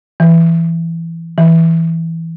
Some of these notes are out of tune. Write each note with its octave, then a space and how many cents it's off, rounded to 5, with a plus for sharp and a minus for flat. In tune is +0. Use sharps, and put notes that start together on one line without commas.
E3 +10
E3 -5